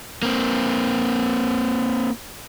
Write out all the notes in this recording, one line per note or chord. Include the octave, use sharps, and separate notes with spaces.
A#3 C4